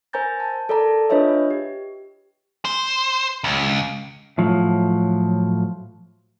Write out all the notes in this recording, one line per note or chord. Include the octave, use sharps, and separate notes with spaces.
A#4 C5 G#5 A#5 G6 A6
A5
A4 A#4 D5 A5 A#5
D4 F4 B4 C#5 D#5 E5
G4
C5
C#2
A2 F3 F#3